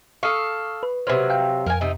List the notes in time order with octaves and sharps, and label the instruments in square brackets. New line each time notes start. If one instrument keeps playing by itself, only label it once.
[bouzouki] A4 F5 [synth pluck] C#6 D#6 C7
[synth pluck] B4
[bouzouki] C3 F#3 [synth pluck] B4 C5 F6
[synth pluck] F5 G5
[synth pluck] F2 [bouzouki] A#4 G#5
[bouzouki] C3 D#4